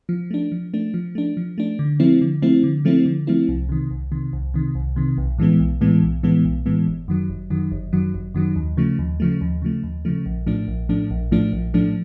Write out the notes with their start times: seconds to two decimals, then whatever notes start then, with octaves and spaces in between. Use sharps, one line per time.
0.09 F3
0.31 A3 D4
0.52 F3
0.74 A3 D4
0.94 F3
1.15 A3 D4
1.37 F3
1.58 A3 D4
1.79 D3
2.00 F3 A3 C4 E4
2.21 D3
2.42 F3 A3 C4 E4
2.64 D3
2.85 F3 A3 C4 E4
3.06 D3
3.27 F3 A3 C4 E4
3.49 C2
3.69 C3 D#3
3.91 C2
4.12 C3 D#3
4.33 C2
4.54 C3 D#3
4.75 C2
4.96 C3 D#3
5.18 B1
5.38 A2 E3 G#3 B3
5.60 B1
5.81 A2 E3 G#3 B3
6.02 B1
6.23 A2 E3 G#3 B3
6.45 B1
6.66 A2 E3 G#3 B3
6.87 G1
7.08 F#2 D#3 F#3
7.29 G1
7.50 F#2 D#3 F#3
7.72 G1
7.93 F#2 D#3 F#3
8.14 G1
8.35 F#2 D#3 F#3
8.56 D#2
8.77 C#3 F3 A3
8.99 D#2
9.20 C#3 F3 A3
9.41 D#2
9.62 C#3 F3 A3
9.84 D#2
10.05 C#3 F3 A3
10.26 A#1
10.47 A2 F3 A3 D4
10.68 A#1
10.89 A2 F3 A3 D4
11.11 A#1
11.31 A2 F3 A3 D4
11.53 A#1
11.74 A2 F3 A3 D4